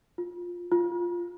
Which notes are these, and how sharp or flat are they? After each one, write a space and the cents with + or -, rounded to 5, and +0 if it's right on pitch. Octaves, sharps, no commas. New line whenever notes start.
F4 +10
F4 +0